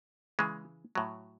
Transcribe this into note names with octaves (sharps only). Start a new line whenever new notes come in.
C#3 E3 G#3
A2 F#3